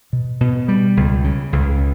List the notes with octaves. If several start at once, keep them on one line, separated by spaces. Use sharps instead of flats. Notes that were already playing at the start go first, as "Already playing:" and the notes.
B2
B2
G3
C#2
C#3
C#2